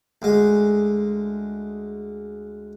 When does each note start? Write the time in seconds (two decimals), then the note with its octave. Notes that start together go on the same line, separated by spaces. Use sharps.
0.22 D2 G#3